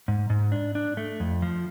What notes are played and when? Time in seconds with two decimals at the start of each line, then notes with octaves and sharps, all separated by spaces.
0.08 G#2
0.30 G#2
0.52 D4
0.75 D4
0.97 A3
1.20 F2
1.42 F3